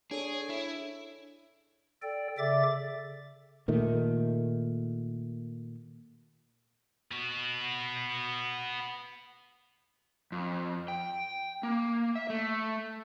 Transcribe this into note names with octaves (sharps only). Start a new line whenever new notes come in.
D4 G#4 A4 C#5
E4
A4 D5 G5
C#3 A4 D5 E5 D6 A6
A#2 D#3 A3
B3 F#4
F2
G5
A#3
E5
A3